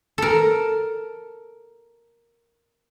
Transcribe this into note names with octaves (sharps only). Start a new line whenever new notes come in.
A4 A#4